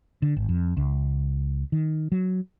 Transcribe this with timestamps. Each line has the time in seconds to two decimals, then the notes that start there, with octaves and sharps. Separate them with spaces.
0.22 D3
0.36 G#1
0.49 F2
0.77 C#2
1.72 D#3
2.12 F#3